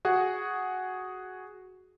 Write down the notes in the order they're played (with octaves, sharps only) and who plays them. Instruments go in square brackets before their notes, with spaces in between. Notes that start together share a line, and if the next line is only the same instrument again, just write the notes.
[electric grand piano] F#4 G#4 F#5